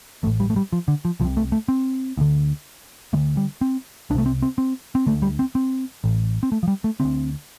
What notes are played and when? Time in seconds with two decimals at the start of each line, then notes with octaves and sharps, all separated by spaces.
0.23 A1 A3
0.27 A2
0.40 G3
0.50 A3
0.56 G3
0.73 F3
0.88 D3
1.05 F3
1.20 C2 F3
1.25 C3
1.37 A3
1.52 A3
1.68 C4
2.17 D2 D3
3.13 D3 A3
3.16 D2
3.37 G3
3.61 C4
4.10 C2 D4
4.15 C3 A3
4.26 C4
4.42 C4
4.58 C4
4.95 C4
5.06 D2 D3 A3
5.22 G3
5.39 C4
5.55 C4
6.04 A1 A2
6.43 C4
6.52 A3
6.63 F3
6.68 G3
6.84 A3
7.00 D2 D3 C4